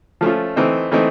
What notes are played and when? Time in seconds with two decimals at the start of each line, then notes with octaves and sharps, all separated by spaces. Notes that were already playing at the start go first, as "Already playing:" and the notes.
0.21 F3 A3 C#4 F4
0.56 E3 A3 C4 D#4
0.92 E3 A3 C4 D#4